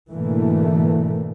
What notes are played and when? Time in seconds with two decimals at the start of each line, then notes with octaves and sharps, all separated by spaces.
0.11 G#2 B2 D3 E3 A3 A#3